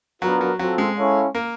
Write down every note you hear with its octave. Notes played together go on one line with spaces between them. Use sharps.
F#3 B3 D4 F4 A#4
F#3
F#3 C4 F4 A4
G#3
C#4 E4 A4 C#5 F5
A#3